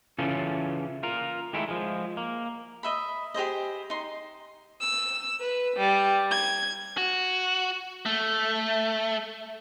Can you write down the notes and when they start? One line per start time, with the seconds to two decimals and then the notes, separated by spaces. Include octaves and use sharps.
0.18 C#3 E3 C#4 F4 A4
1.03 F4 A#4
1.53 D#3 G#3 A3 E4
1.69 F3 G#3
2.17 A#3
2.83 D#5 E5 B5
3.34 G4 G#4 C5 D#5
3.90 D#4 C6
4.80 E6
5.41 B4
5.76 G3
6.31 G#6
6.97 F#4
8.06 A3